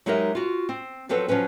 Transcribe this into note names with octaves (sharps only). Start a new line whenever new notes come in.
F#3 G#3 D#4 G4 A#4 E5
F4 F#4
C4
F3 F#3 C4 A4 B4
F3 F#3 C#4 B4